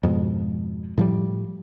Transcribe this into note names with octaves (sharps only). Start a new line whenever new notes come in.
F2 G#2 B2
A2 F3 G3